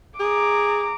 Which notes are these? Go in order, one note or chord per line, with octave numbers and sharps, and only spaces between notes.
G#4 A#5 D6